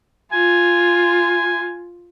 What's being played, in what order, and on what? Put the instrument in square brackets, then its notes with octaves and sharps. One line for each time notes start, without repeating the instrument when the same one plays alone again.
[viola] F4 [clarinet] G#5